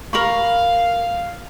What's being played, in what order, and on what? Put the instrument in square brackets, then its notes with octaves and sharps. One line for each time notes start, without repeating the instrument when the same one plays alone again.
[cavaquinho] A#4 B5 C#6 [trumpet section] F5